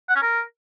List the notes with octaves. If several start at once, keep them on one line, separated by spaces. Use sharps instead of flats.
F#5
C#4
A#4